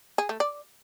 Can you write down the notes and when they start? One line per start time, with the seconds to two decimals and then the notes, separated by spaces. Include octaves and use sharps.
0.18 G#4
0.29 A3
0.40 D5